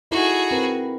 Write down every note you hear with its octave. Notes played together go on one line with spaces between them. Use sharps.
D#4 E4 F#4 G#4 A4
C4 A#4 B4